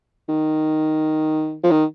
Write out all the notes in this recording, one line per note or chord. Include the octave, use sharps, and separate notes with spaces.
D#3
F3
D#3